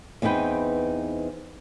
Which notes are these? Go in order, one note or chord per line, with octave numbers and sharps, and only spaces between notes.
E2 C4 D#4 B4 G5